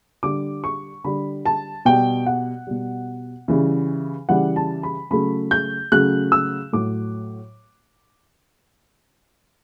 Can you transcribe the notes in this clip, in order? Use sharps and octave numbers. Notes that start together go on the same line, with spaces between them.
D3 G3 D6
C#6
D3 G3 B5
A5
B2 G3 G5
F#5
B2 G3
C#3 E3 G3
C#3 E3 G3 F#5
A5
B5
C#3 F#3 A3 B5
G6
C#3 F#3 A3 F#6
E6
A2 F#3 A3 D6